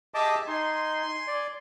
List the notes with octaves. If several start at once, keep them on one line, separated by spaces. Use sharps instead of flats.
G4 G#4 D#5 E5 A5 D6
D#4 G#5 C6
D5